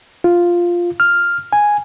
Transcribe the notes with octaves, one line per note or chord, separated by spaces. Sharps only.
F4
F6
G#5